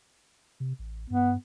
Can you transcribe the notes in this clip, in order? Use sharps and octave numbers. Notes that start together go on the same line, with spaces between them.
C3
A1
G2 B3